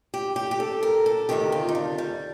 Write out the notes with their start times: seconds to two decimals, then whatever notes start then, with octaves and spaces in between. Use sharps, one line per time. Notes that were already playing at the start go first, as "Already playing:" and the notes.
0.14 G4
0.36 G4
0.51 G4
0.60 A4
0.83 A#4
1.06 A4
1.29 D2 C3 D#3 G4
1.52 F4
1.69 D#4
1.75 D4
1.98 G3